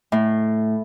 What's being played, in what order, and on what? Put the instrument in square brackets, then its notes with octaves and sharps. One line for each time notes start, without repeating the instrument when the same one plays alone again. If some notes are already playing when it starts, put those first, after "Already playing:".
[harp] A2